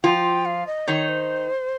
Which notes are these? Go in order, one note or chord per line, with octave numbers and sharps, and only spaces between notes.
F3 F4 G5
F5
D#5
D#3 D#4 C#5
C5